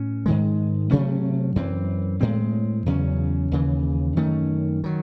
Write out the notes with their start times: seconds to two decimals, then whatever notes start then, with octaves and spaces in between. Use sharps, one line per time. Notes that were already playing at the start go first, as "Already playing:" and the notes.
Already playing: A2 C#4
0.26 G#2 D#3 G#3
0.91 C3 F#3 A3 C#4
1.56 F#2 E3 C4
2.21 A2 G#3 C4
2.86 E2 C#3 F#3 C#4
3.51 D#2 C#3 E3
4.16 F#2 D#3 A3 C#4
4.84 D#3 F#3